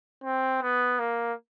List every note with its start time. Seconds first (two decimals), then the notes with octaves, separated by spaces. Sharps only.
0.24 C4
0.62 B3
0.99 A#3